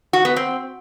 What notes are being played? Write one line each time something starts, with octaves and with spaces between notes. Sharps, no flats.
F#4
B3
C4